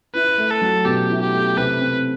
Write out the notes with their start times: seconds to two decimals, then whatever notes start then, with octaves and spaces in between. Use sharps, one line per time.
0.14 E4 B4
0.38 A3
0.51 A4
0.62 F#3
0.85 B2 G4
1.10 E4
1.21 G4
1.33 A3
1.57 C3 B4
1.81 C4